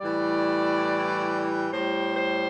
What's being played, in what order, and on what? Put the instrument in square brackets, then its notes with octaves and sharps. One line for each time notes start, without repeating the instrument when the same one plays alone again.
[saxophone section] A2 E3 G3 D5
A2 G3 C5
C5